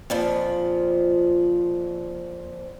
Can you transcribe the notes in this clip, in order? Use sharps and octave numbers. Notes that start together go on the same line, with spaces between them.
F2 A#2 F3